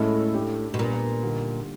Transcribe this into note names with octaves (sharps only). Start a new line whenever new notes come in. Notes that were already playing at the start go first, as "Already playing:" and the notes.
Already playing: A2 G#3 C#4 E4 A4
A3 D4 G4
B2
A#2 G3 B3 D4
D3 G3 A#3 D#4